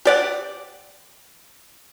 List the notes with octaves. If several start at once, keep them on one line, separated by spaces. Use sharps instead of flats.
G4 D5 F#5